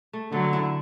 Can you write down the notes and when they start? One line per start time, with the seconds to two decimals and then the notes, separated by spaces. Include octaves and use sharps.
0.13 A3
0.32 D3 F#3 A3
0.53 E4